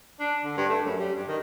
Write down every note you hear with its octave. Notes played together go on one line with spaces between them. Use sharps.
D4
D3
G2
A3
F#2
G3
G2
D#3